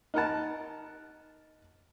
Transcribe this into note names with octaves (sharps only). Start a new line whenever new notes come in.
D#4 A#4 F#5 A5